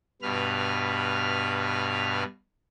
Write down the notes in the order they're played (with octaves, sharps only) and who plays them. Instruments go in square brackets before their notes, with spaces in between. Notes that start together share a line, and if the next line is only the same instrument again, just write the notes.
[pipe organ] G2 B2 B4 F6